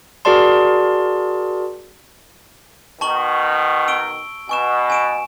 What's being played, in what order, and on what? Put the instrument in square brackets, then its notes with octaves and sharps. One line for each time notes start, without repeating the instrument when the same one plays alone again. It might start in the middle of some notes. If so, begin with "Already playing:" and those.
[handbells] F#4 G#4 A#4 D5 A5 C6
[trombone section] B2 D#3 [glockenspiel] A5 C#6 F#7
[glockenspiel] E6 D7 G7
[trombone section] B2 [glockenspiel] G#5 C#6 E7
[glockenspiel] G#5 D7 E7